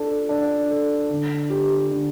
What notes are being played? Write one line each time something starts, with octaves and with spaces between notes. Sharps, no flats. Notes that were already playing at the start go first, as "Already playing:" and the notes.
Already playing: D4 A4
D4
A4
D3
G4
D3